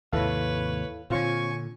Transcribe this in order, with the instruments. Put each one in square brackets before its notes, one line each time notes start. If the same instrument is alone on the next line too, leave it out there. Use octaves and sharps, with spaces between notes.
[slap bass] D#2 G#2 C3 [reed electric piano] E4 A4 F5 [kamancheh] B4 C#5
[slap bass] A#2 D3 [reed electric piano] C4 F4 C#5 [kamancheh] G#5 C#6